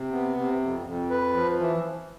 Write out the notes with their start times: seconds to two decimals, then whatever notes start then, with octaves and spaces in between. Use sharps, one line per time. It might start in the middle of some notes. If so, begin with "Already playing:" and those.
Already playing: C3
0.12 B3
0.37 C3
0.61 F2
0.86 F2
1.10 B4
1.34 F3
1.59 E3